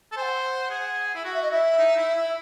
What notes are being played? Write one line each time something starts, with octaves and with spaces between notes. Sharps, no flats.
A4
C5 F#5 G#5
G#4
E4
F#4 F#5
E5
D#5
E4 E5
D#4
E4
E4